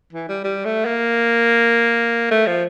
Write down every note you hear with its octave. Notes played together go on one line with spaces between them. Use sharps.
E3
G3
G3
A3
A#3
A3
F3